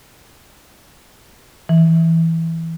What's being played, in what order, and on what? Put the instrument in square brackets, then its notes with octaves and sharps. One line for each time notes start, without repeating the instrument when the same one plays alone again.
[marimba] E3